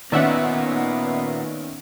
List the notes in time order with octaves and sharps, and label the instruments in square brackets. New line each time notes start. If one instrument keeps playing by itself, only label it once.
[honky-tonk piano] D#3 C#4 [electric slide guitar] A#3 F4 [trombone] B3 [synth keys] D5 E5 F#5